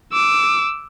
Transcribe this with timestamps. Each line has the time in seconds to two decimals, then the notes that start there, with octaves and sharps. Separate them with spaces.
0.12 D6 E6